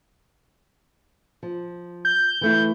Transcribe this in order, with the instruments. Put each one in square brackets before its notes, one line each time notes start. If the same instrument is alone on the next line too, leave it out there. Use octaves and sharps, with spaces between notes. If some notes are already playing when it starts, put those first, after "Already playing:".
[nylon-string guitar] F3
[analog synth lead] G6
[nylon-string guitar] E3 A3 E4